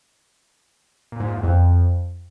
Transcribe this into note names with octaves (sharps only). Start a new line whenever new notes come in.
A#2
G#2
A#2
E2
F2